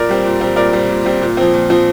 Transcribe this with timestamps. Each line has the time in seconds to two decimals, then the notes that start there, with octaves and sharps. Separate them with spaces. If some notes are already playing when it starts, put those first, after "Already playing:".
Already playing: A#2 A#4 D5
0.09 G3 C4
0.25 A#2
0.41 G3 C4
0.56 A#2 A#4 D5
0.73 G3 C4
0.89 A#2
1.04 G3 C4
1.22 A#2
1.37 F3 C4
1.54 A#2
1.70 F3 C4